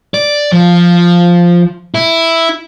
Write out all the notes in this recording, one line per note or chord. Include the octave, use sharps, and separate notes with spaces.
D5
F3
E4